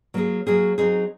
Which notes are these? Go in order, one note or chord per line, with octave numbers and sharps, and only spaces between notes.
F#3 A#3 C#4 G#4
F#3 A#3 C#4 G#4
F#3 C4 D#4 G#4